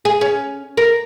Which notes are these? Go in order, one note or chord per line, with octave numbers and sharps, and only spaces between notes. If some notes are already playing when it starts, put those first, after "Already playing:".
G#4
C#4
A#4